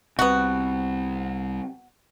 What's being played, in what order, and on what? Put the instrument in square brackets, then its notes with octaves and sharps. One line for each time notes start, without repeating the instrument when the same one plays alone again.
[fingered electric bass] C2 C3 [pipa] B3 F#4